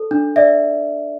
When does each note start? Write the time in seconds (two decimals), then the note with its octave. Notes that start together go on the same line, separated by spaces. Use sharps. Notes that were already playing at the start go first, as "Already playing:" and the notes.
Already playing: A4
0.11 D4
0.36 D5 E5